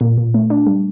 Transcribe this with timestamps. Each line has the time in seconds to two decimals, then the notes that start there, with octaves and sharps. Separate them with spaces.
0.01 A#2
0.18 A#2
0.34 A3
0.50 D4
0.67 G3